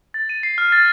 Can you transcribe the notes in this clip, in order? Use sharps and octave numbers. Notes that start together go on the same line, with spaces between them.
A6
D#7
C7
F6
A6